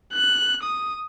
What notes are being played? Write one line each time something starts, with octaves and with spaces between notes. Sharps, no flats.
F#6
D#6